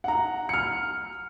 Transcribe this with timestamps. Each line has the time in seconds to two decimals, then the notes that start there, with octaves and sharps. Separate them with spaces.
0.04 F#5 A#5
0.49 F6 C#7